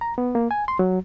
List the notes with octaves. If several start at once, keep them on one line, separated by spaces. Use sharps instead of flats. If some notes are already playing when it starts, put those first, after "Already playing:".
A#5
B3
A#3
G#5
C6
F#3